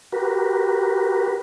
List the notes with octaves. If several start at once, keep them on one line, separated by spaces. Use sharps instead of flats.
F#4 G4 A#4 B4